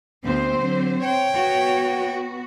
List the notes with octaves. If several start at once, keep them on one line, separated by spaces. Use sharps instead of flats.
D2 B3 C4 C5
D3 F#3
C#5 G5
B3 F#4